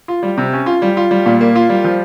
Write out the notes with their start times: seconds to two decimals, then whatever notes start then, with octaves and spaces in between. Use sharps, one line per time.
0.08 F4
0.23 G3
0.37 C3
0.53 C#4
0.66 F4
0.82 G3
0.97 F4
1.11 G3
1.26 A#2
1.41 A#3
1.55 F4
1.69 G3
1.84 F3